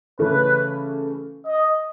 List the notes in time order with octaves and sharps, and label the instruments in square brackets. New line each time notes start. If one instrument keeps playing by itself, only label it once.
[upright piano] C#3 E3 A3 C#4 [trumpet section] B4
[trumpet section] D#5